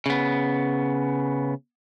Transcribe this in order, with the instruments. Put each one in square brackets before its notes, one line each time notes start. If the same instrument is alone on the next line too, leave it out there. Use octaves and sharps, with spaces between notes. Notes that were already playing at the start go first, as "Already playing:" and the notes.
[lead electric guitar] C#3 B3